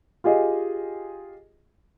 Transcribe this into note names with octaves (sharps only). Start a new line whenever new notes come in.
F4 G4 G#4 D#5